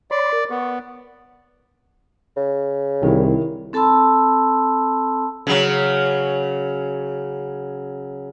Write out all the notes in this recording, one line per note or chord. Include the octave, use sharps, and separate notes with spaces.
C#5 D5 B5 C6
A#4
B3 C#6
C#3
C2 D#3 E4
C4 A4 A5 B5 C6 E6
C#3 F#3